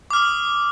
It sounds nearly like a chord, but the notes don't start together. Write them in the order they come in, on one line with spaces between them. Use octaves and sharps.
D6 F6 D#6